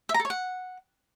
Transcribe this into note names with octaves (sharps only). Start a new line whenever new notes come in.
E5
A#5
A4
C#5
F#5